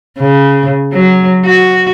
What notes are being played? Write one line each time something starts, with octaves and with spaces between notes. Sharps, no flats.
C#3
F#3
F#4